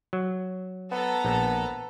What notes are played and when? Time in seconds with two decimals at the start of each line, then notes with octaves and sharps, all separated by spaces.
0.13 F#3
0.91 B3 A4 A#5
1.25 A#1